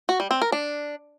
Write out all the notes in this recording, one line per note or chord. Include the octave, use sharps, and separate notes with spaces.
F#4
G3
C4
A#4
D4